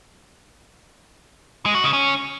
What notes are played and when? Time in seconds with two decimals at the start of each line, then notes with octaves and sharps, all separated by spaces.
1.66 G#3
1.75 F#4
1.84 C#3
1.93 C#4